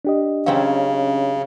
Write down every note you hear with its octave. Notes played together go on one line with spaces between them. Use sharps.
D4 G4 D#5
C#3 F#3 C4 C#4 F5